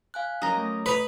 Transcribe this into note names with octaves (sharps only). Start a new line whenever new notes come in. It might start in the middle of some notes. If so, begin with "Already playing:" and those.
F5 G#5 F#6
F#3 C#4 A#4 D#5 A#5
A3
B4 D#6 F7